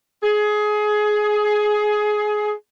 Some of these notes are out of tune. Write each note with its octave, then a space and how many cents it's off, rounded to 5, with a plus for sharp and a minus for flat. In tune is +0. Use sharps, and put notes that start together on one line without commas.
G#4 +20